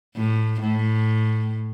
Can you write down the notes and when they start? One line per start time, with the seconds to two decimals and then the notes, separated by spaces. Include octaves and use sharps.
0.16 A2
0.61 A2